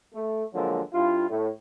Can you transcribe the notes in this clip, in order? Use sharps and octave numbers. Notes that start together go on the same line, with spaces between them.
A3
D3 F3 F#3 G#3 A#3
G2 E4 F4
A2